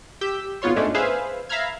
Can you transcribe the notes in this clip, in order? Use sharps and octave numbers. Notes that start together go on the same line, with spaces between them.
G4 E6 G6 B6
G#1 B3 F4 C#5 C6
G#2 G#3 A3 C#4 D4
G#4 B4 C5 E5 F5
E5 F5 A#5 B5 F6 G#6